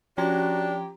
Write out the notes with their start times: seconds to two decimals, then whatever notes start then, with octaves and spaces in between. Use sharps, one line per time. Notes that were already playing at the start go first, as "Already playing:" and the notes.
0.18 F3 C#4 D4 F#4 G4 A#5